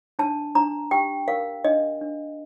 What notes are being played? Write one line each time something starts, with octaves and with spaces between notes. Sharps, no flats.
D4 A5
D4 A#5
G4 G5
A#4 F5
D4 D#5
D4